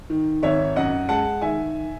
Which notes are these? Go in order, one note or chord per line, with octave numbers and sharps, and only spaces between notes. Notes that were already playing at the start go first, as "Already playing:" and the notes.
D#3
G#1 C#5 E5
F#2 D#5 F#5
G#3 F#5 A5
D#3 E5 G#5